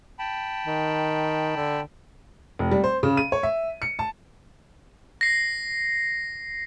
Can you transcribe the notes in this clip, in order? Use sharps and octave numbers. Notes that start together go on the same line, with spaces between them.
G5 A5 B5
D#3
D3
F1
G3
C5
C#3
D#7
C#5
E5
C#7
A5
A#6 C7